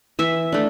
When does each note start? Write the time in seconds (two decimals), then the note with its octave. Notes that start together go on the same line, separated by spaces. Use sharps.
0.19 E3 E5
0.52 A3 D4